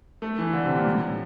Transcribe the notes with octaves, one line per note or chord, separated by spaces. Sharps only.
A3
E3
D3
C3
A#2
A2